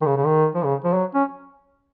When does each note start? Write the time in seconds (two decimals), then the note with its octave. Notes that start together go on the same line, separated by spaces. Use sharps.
0.01 D#3
0.06 C#3
0.17 C#3
0.26 D#3
0.55 F3
0.64 C#3
0.84 F3
0.94 F#3
1.15 C#4